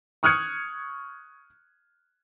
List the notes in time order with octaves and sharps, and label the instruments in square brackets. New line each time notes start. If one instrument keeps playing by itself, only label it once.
[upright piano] C#6 D#6 F6 F#6 G#6 C#7